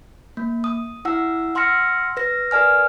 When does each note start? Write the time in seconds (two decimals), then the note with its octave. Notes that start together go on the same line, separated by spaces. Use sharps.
0.37 A#3
0.64 D#6
1.05 E4 F#5 E6
1.55 F#5 C6 E6 F6 A#6 C#7
2.17 B4 A#6
2.51 A#4 B4 D5 G#5 F6